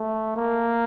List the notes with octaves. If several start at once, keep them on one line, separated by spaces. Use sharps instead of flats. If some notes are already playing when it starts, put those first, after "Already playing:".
Already playing: A3
A#3